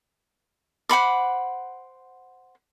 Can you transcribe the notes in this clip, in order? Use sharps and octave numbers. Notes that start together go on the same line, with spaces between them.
C5 F#5 B5 D6